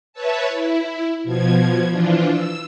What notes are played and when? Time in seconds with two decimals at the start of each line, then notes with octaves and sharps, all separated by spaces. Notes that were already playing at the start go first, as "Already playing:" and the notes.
0.13 B4 C#5 E5 A5
0.49 E4
1.24 B2 F3 G#6
1.90 E3 F3 D4 F4
2.30 E6